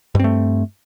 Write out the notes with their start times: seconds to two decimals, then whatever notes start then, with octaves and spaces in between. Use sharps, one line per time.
0.15 G2
0.20 C4
0.24 A3